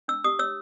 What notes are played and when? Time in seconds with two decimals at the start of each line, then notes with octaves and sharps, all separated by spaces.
0.08 D4 E6
0.24 G4 D#6
0.39 C#5 E6